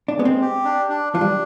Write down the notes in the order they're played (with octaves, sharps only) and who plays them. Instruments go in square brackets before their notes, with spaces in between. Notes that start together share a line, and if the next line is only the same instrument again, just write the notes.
[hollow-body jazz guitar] D4
[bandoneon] G#3 [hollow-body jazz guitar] B3
[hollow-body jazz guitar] C4
[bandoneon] G4
D4
D4
[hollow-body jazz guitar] F3 [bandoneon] D4
[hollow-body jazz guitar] G3